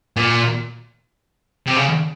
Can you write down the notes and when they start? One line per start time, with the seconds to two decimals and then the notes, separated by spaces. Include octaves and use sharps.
0.17 A#2
1.66 C3
1.76 C#3